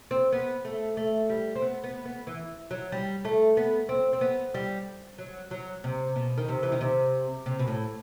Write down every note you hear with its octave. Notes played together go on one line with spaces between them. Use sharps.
C4
B3
A3
A3
G3
C4
B3
B3
B3
E3
F#3
G3
A3
B3
C4
C4
B3
G3
F#3
F#3
C3
B2
D#3
C3
E3
D#3
C3
C3
B2
A2